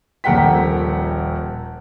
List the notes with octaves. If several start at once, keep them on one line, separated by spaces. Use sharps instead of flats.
D#1 A#1 A#4 F#5 G5 B6